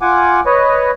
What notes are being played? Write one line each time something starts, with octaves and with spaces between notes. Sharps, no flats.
F4 F#5 G#5 D6
B4 C#5 D#5